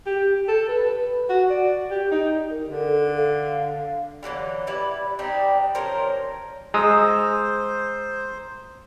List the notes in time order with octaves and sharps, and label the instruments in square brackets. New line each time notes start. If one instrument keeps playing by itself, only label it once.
[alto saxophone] G4
A4
B4
F#4
D5
G4
D#4
[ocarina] A#4
[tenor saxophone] D3
[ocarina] A4
F5
[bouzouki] D3 E3 F#3 G3
G3 E4 B4 D5
G3 C4 D4 D#4
F3 C#4 A#4 C5
[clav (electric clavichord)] G#3 [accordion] C5 [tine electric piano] A#5 D#6 E6